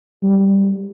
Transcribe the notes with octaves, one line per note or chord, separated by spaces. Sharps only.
G3